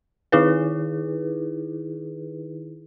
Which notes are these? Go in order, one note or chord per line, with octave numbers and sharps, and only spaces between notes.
D#3 D#4 E4 G#4 B4